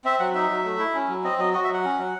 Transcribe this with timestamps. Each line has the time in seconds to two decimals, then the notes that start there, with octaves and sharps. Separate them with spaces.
0.05 C4 E5
0.19 F#3 F#5
0.34 D#4 E5
0.50 F#3
0.65 A3
0.79 E4
0.94 C#4
1.09 F#3
1.24 C4 D#5
1.38 F#3 D#5
1.53 F#4 D#5
1.64 E5
1.69 F#3 F#5
1.84 C#4
1.98 F#3